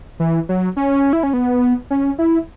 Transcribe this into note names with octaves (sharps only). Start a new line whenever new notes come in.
E3
F#3
C#4
E4
C#4
B3
C#4
E4